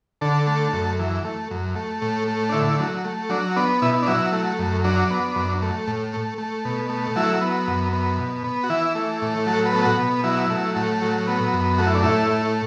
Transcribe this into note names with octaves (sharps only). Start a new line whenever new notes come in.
D3 A4
A3
F#2
E3
A3
F#2
A3
A2
A3
D4
D3 E4
F#3
A3
F#3 D4
B3 D4
B2 E4
D4
F#3 E4
A3
F#2
F#3 D4
B3
F#2
A3
A2
A3
A3
B2
A3
F#3 E4
B3
F#2
B3
B2
B3
F#4
E3 E4
A3
A2
F#3 A4
B4
B3 A4
F#4
B2
F#3 E4
A3
A2
F#3
B3
F#2
A3 F#4
E4
D4
A2 E4
A3